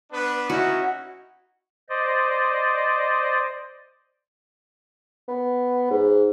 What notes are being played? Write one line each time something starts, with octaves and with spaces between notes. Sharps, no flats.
B3 D4 B4
C#4 D#4 E4 F#4
C5 D5 D#5
B3
G#2